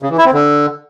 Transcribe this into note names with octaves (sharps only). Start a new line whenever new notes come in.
C#3
E3
E4
C4
D3